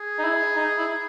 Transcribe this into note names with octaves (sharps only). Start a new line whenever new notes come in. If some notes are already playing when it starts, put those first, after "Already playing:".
Already playing: G#4
D#4
E4
D#4
E4